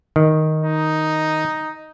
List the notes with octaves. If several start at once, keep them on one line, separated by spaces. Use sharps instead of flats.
D#3
D#4